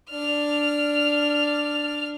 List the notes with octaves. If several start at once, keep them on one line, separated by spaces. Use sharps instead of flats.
D4 F6